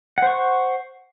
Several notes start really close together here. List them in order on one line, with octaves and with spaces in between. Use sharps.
F#5 C5 C#6